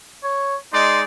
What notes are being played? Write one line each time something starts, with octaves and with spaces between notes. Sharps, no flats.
C#5
G#3 D#4 D5 C6